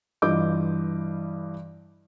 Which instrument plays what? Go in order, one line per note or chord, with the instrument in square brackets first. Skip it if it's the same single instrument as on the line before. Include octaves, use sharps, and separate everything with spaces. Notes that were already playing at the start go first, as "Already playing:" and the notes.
[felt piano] G2 E3 F4 D#5 D6 G6